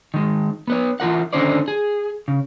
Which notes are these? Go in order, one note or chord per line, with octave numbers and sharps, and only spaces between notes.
D#3 G#3
B3 B4 C#5
E3 F4 A#4 F#5
D3 D#3 C#4 D#4 C5 D5
G#4
C#3